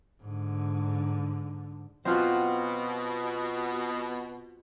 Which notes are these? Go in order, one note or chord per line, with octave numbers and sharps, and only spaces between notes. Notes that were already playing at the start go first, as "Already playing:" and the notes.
G#2 D3
B2 C4 F4 F#4